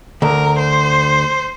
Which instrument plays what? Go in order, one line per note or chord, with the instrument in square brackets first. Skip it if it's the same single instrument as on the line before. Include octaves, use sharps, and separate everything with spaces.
[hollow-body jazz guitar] D2 [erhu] A#4
[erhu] C5